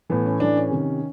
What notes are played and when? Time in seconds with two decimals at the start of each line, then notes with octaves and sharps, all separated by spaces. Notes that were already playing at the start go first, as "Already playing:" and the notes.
0.10 A2 E3 B3
0.25 C#4
0.40 A2 E3 D4
0.56 C#4
0.71 C3 D#3